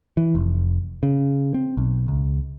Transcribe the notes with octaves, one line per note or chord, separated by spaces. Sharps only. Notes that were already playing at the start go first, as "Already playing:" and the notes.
E3
F1
C#3
C4
B1
C#2